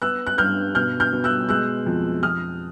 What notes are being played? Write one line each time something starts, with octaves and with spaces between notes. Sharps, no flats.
B3 E6 F#6
F#6
G2 F6 G6
B2 F6 G6
F6 G6
B2
E6 F#6
G#3 E6 F#6
F2
F2 D#6 F6